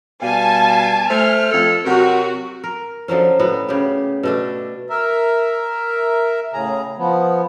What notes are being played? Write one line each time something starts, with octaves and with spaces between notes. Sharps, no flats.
B2 G3 F5 G#5 A5
A3 C5 F6
F2 A4
C3 F#3 F#4 A#4
A#4
D3 F3 F#3 C#4
A2 B3 F#4
C#3 G4
B2 A3 D4
A#4 E5
A2 C#3 G#4 A#5
F3 B3